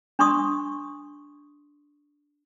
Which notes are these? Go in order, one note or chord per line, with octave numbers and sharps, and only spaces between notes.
D4 C6 C#6 D#6